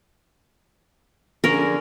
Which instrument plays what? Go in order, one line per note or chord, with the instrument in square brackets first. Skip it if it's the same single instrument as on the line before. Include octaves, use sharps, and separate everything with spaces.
[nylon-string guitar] D3 F3 G#4 [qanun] C#4 A#4